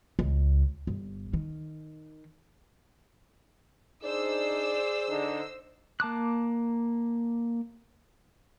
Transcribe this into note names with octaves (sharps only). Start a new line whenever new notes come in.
C#2
G1
D#3
D4 D#4 G#4 C5 D5 E6
D3 D4 D#4
A#3 A5 D6 F#6